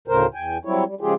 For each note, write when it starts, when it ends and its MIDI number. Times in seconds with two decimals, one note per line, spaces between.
0.08 0.27 38
0.08 0.27 45
0.08 0.27 49
0.08 0.27 70
0.08 0.27 72
0.34 0.58 40
0.34 0.58 79
0.34 0.58 80
0.65 0.84 54
0.65 0.84 55
0.65 0.84 60
0.65 0.84 64
0.65 0.84 73
0.86 0.95 55
1.01 1.14 49
1.01 1.14 53
1.01 1.14 56
1.01 1.14 65
1.01 1.14 67
1.01 1.14 68